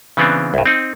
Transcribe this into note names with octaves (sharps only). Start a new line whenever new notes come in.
C#3 E3 B3 C4 D4
C2 G2
C4 D#4